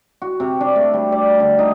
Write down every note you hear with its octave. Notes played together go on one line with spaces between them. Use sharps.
F#4
C3
D4
A3
G3
D5
D3
D#4